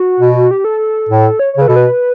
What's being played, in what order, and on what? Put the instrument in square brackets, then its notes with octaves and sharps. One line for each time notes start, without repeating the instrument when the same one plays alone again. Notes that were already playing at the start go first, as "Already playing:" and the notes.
Already playing: [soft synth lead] F#4
[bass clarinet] B2
[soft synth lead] G4
A4
[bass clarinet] A2
[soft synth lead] C#5
C#5
[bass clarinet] C#3 [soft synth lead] B4
[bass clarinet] B2 [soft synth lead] A4
[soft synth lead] B4